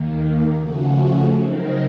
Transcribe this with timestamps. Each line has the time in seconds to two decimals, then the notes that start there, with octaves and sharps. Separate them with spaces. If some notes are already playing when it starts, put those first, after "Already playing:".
Already playing: D#2 D#3 A#3
0.58 C#3 F3 A3 C#4 F#4
1.38 C#3 F#3 C4 D#4 A#4